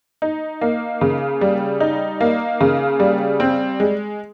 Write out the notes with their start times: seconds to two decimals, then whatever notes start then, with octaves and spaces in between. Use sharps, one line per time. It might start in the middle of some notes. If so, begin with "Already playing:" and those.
0.22 D#4
0.61 A#3
1.01 C#3
1.41 G3
1.80 D#4
2.21 A#3
2.61 C#3
3.00 G3
3.40 C4
3.80 G#3